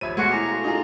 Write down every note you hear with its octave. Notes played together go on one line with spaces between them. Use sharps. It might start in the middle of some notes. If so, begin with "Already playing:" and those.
A#1 D#2 C5 C#5 E5 B5 G#6 D#7
B2 G#3 A3 F#4 C#6 G#6
E4 G#5 A#5 D6
F#4 A4 F5
D#4 F4 F#4 G#4 A4